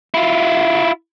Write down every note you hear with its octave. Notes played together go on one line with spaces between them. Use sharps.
E4 F4